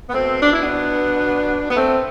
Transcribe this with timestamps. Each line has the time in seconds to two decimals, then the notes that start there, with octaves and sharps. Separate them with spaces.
0.09 B3
0.14 B2 A3 C4
0.41 D4
0.52 E4
0.63 B3 D4
1.70 B3
1.77 A3 C4